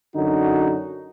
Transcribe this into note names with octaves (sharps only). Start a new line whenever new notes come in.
F#2 D3 D#4 F#4